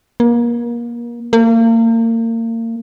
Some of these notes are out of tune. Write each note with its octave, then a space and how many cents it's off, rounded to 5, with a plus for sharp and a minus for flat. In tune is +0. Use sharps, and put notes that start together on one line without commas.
A#3 +30
A#3 -35